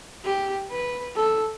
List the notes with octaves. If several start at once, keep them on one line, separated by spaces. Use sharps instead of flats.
G4
B4
A4